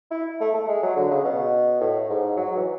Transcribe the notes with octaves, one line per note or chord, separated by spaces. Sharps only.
E4
A3
A3
G#3
F#3
D3
C#3
B2
A2
G#2
F#3
E3